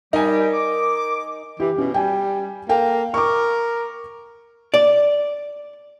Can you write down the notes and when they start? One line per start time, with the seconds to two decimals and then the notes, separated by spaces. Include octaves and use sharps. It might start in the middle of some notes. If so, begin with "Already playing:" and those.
0.13 G3 D#4 G4 A#4 G#5
0.54 D6
1.60 E3 G4
1.78 B2 C#4
1.94 G3 G5 G#5
2.69 A#3 A4 G5
3.14 A#4 C#6 D6
4.74 D5